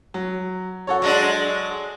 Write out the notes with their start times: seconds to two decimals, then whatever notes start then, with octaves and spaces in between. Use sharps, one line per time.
0.14 F#3
0.87 F#4 A4 C#5
1.02 F#3 G#3 D4